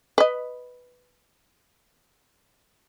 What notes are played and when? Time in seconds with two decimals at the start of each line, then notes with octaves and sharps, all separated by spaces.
0.18 B4 D#5